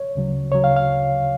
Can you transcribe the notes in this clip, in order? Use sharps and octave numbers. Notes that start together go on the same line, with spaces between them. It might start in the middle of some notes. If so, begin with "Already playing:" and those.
Already playing: C#5
D2 C#3 F#3
D2 C#3 F#3 C#5
F5
F5